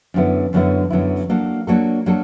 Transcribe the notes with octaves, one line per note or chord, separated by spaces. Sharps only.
F#2 D3 F#3 B3 E4
F#2 D3 F#3 B3 E4
F#2 D3 F#3 B3 E4
F#3 A#3 D4 F#4 A4
F#3 A#3 D4 F#4 A4
F#3 A#3 D4 F#4 A4